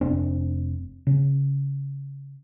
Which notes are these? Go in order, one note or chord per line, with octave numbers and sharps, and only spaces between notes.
F1 C4 D4
C#3